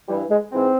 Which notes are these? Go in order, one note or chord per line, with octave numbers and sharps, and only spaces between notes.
G2 E3 G3
G#3
G#2 E3 C4